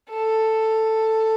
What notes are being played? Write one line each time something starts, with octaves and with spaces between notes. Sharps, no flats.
A4